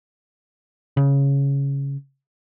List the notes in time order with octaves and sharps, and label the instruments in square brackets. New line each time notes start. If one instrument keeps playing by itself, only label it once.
[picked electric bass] C#3